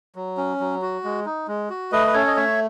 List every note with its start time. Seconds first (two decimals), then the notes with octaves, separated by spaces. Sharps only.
0.16 F#3
0.37 C#4
0.60 F#3
0.82 F#4
1.04 G#3
1.26 D#4
1.48 G#3
1.70 F#4
1.92 A3 B4 D#5
2.07 B4
2.14 C#4 A4 C#5
2.27 D#5
2.36 A3 C#5 E5